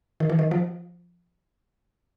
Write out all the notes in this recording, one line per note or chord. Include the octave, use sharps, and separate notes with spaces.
D#3
E3
D#3
F3